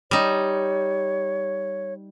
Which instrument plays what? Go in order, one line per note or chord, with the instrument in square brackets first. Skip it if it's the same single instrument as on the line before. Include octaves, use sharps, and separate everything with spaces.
[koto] G3 D#4 [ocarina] C#5